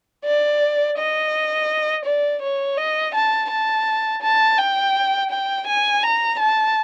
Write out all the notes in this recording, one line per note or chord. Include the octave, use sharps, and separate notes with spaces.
D5
D#5
D5
C#5
D#5
A5
A5
A5
G5
G5
G#5
A#5
A5